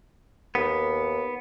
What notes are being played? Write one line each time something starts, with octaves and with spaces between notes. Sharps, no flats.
D#2 B3